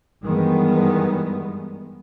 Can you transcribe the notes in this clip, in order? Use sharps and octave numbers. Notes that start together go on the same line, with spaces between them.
G2 D#3 E3 G3 G#3 B3